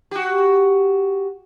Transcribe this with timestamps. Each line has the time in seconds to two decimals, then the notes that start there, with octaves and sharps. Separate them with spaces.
0.11 F#4 G4